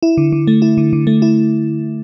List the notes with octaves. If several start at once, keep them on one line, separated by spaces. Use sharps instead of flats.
E4
D3
D3
A3
E4
D3
D3
A3
E4